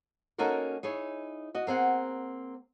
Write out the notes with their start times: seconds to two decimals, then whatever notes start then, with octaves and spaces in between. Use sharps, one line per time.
0.38 A#3 C#4 D#4 F#4 A4 A#4
0.83 D#4 E4 G#4 C#5
1.55 F#4 D#5
1.67 A#3 C4 G#4 F#5